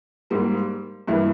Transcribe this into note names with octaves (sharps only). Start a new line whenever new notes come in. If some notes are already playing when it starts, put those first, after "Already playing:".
G#2 G3 A#3
G2 E3 G3 A#3 E4